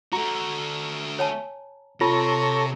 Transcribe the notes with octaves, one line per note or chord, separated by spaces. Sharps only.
A3 F#4 A#5
C#5 G#5 A5
C3 F4 A4 C#5 A#5